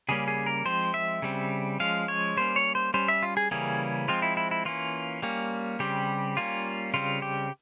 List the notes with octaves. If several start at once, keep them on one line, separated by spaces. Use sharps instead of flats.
C#3 G3 A#3 C#4 G#4
G#4
A#4
F3 G#3 C4 C5
E5
C#3 G3 C4
F3 G#3 C#4 F5
C#5
G3 A#3 C#4 C5
C#5
C5
G3 C#4 C5
E5
F4
G#4
C#3 E3 G3 A#3 C#4 G#4
F3 G#3 C4 F4
E4
E4
E4
E3 A#3 C#4 F4
G3 A#3 C#4
C#3 G3 C4 G4
G3 A#3 C#4 F4
C#3 G3 C4 F4
G4